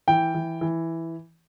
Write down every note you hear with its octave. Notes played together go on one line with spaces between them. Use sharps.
E3 G5
E3
E3